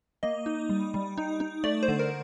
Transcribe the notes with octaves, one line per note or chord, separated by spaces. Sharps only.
A#3 D#5
D#4
G3
G3
D#4
D#4
A3 D5
C5
D3
A#4